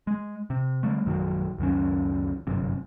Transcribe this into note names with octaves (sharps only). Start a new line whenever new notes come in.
G#3
C3
D3 G3 A3
A#1 F#2 D#3 F#3
C#2 F#2 D#3 C#4
G1 F#2 C3